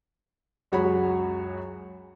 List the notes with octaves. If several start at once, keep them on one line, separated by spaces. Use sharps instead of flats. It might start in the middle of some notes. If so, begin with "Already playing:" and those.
C#2 F#2 F#4 G#4 C#5 B5